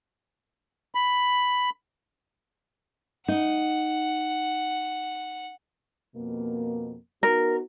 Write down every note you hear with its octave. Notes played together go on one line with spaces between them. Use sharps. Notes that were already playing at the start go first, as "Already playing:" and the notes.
B5
D#4 F#5
F2 B2 A#3
B3 D#4 F#4 A#4